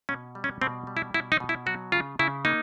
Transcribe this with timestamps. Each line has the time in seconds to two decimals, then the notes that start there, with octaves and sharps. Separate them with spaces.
0.09 B2 C#4
0.35 G3
0.44 C#4
0.61 B2 C4
0.87 G3
0.97 E4
1.14 B2 E4
1.32 D#4
1.40 B2
1.49 E4
1.66 F#3 F#4
1.92 C#3 F4
2.19 C#3 E4
2.45 A#3 D#4